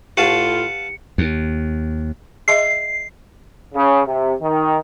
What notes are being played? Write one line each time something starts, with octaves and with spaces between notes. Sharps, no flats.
A2 F4 G4 B4 F5 F#5 A5 C#7
D#2
G#4 D#5 E5 C7
C#3
C3
D#3